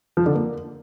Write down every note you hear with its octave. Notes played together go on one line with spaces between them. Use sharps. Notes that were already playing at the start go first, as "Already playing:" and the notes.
F3
D3
A#3